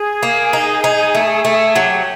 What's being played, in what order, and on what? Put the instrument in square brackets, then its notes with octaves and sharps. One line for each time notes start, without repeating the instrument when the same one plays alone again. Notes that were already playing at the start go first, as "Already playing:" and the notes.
Already playing: [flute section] G#4
[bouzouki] A#3
D#4
D#4
A3
A3
[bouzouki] F#3 [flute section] G4